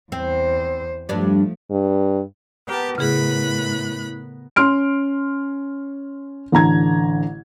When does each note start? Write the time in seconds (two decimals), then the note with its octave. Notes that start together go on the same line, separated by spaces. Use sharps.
0.12 E2 C4 C5
1.09 G2 F3 A3 D4
1.70 G2
2.67 B3 G4 A#4 A5
2.98 A2 C#3 E4 G#4 B5 F#6
4.56 C#4 C6 F6 D7
6.52 A1 D3 A#5 G#6